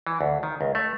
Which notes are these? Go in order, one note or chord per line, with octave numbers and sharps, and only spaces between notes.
E3
D2
D#3
C#2
A3